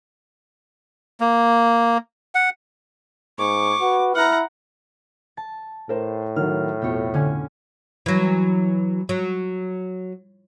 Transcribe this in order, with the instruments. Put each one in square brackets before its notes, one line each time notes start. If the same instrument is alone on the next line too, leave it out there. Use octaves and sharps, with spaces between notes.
[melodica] A#3
F#5
[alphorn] G#2 [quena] C#6 [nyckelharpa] D6
[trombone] F#4 [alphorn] B4
[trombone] E4 [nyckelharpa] F#5 A#5 [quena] F6
[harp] A5
[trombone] A2 [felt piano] A#4 C5
[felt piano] D#3 F#3 [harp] F6
[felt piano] F2 B2 [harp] G4 C#5
[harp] D3 C#4 G#5
[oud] E3 F#3
F#3